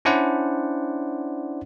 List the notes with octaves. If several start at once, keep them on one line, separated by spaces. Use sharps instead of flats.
C#4 D4 E4 C5 D5 F#5